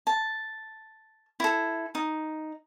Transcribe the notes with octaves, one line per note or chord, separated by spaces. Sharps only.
A5
E4 A4
D#4